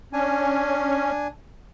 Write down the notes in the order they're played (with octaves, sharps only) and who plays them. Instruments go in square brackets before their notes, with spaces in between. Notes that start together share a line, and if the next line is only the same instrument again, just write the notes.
[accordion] C#4 [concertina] D4 G#5